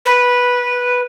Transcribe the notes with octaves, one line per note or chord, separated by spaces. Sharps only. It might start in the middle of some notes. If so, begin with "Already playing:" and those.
B4